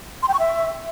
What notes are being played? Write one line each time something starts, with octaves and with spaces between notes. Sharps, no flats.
C6
G5
C#6
E5